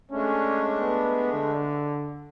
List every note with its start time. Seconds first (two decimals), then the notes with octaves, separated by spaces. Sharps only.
0.11 G#3 A3 C#4 D4
0.80 B3
1.33 D3